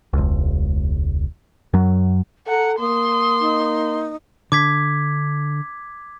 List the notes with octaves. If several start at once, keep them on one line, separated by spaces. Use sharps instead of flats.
E1 C#2
F#2 F#3
A4 F#5 A#5
A#3 C6 D#6
D#4
D3 D6 G#6 B6